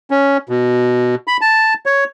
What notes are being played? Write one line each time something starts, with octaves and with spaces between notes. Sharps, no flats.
C#4
B2
B5
A5
C#5